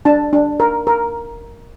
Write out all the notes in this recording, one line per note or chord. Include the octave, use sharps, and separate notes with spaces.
D4 A5
D4
A#4
A#4